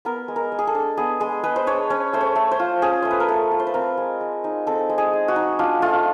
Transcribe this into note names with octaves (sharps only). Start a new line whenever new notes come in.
B3 A#4
G#3
A#4
G#3
G#4
A4
D4
B3 G#4
G#3 G#4
G#3 B4
C5
D4 C#5
C#4 C#5
A3 C5
C#5
A3
C5
F4
C#4 G#4
A3 C5
B4
A#4
A3 A4
F4
C5
B4
C4 A#4
G#3
G#3
D#4
C4 A4
G#3
G#4
G#3
F#4
D#4
D4 F4
A3 F4